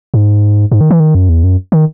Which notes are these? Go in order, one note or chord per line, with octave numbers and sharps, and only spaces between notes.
G#2
G#2
D#3
E3
D#3
F#2
E2
F#2
D#3